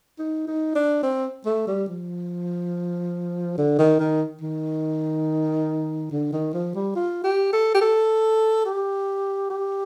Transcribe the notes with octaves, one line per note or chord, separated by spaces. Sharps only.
D#4
D#4
D4
C4
A3
G3
F3
D3
D#3
D#3
D#3
D3
D#3
F3
G3
F4
G4
A4
G4
A4
G4
G4